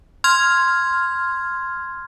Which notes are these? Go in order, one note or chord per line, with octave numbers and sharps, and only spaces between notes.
C6 F6 G#6